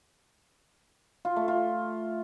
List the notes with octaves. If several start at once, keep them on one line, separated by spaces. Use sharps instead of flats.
F4
A3
F4